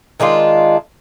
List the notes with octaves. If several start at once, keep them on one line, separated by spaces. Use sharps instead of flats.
D#3 G#3 D4 F4